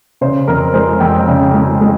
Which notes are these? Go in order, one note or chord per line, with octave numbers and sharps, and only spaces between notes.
C#3 C5
F2 A#4
G#3 C5
F2 G5
C#3
G#3
G#3